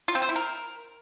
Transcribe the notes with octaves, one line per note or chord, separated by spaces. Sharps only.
F4
C4
C5
E4
A#4